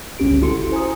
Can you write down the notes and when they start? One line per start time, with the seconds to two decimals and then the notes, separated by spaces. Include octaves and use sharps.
0.18 G1 C#2 C#4 G4 D7
0.42 E4 F#4 A4 C6 C#7
0.72 C5 G#5 A#5 D#6